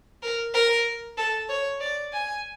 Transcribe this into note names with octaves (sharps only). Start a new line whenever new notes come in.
A#4
A#4
A4
C#5
D5
G#5